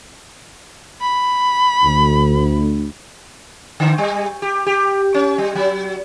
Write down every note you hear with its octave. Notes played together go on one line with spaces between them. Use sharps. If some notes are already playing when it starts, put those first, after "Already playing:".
B5
D2
D3
G3
G4
G4
C#4
G3
F#3